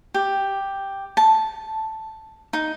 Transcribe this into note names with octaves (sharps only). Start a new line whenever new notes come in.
G4
A5
D#4